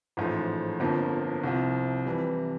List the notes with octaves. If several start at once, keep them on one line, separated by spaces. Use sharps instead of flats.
A1 G#2 F3 A3
G1 F2 D3 F3 A#3
C2 C3 F3
F2 C3 E3 G3